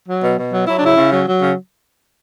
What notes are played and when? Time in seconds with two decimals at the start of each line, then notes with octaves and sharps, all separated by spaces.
0.08 F#3
0.23 B2
0.38 B2
0.52 F#3
0.67 F#3 E4
0.76 D4
0.82 C#3 E4
0.97 C#3
1.12 F#3
1.27 F#3
1.42 C#3